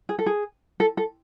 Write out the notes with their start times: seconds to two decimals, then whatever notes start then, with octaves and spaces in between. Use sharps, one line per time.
0.09 G#4
0.19 A4
0.26 G#4
0.80 A4
0.97 A4